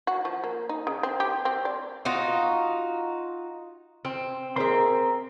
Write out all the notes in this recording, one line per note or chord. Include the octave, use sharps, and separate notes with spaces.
F#4
F3
A#3
D#4
C#3
C4
G4
C4
D5
D#4 F4 F#4
C4
C4 G#4 A#4 C5 E5 C6